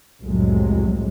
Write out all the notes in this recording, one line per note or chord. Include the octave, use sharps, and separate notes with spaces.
C2 F2 A2 C3 F#3 G#3